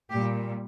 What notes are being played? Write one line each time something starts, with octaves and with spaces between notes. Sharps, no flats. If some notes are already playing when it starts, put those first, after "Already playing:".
A#2 G3 G4